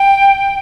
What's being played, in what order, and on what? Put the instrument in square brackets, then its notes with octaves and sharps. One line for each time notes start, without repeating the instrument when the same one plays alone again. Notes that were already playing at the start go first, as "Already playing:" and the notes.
Already playing: [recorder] G5